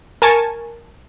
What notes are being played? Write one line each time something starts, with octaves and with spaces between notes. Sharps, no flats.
A#4 G#5 A5 C#6